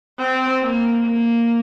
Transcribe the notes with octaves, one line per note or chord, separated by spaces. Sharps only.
C4
A#3
A#3